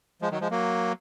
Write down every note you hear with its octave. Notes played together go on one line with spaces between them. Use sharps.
F3 G#3
D#3 F#3
F3 G#3
F#3 A#3